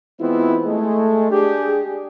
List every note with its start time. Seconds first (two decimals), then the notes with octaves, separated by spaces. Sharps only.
0.20 E3 G#3 B3 C4 E4 F4
0.65 G#3 A3
1.30 D4 G4 G#4